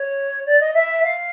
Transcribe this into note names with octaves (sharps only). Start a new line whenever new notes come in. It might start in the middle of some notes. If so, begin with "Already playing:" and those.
Already playing: C#5
D5
D#5
E5
F5